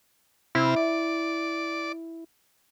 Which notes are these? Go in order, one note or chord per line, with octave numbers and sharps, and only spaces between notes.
C3 C4 E4 F6
D5